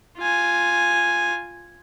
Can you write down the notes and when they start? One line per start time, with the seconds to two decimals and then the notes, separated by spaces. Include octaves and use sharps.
0.18 F4 G#5